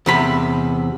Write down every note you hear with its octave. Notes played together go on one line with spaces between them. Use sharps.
E2 C3 B5